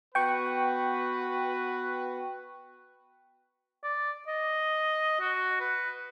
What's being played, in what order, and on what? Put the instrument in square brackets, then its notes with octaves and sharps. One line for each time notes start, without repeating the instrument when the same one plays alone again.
[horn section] B3 F#4 B4 [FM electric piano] G5 C#6
[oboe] D5
D#5
F#4
B4